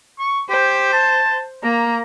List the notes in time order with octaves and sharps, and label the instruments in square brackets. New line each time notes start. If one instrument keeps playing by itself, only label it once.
[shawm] C#6
[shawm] G4 [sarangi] C5
[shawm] A5
[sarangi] A#3 [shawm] A#5